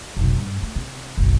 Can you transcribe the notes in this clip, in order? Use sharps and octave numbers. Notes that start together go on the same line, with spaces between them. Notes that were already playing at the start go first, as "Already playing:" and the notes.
F1 B1
G2
A3
C3
F#1 B1